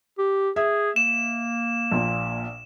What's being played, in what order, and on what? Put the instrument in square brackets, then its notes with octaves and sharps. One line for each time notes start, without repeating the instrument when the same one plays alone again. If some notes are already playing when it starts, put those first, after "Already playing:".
[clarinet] G4
[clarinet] G#4 [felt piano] E5
[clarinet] A#3 [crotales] E7
[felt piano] A#1 A#2